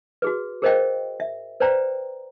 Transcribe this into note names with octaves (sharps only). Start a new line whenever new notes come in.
F#4 G#4 B4
G#4 A#4 C5 D#5 F5 G5
E5
B4 C5 D5 G5 A#5